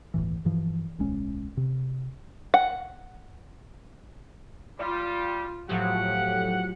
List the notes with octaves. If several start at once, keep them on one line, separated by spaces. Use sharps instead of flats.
G1 D#2 A2 E3
G2 E3 F3
D1 B1 G#3 C#4
C3
F#5
G3 F4
A2 F3 F#3 G4 F#5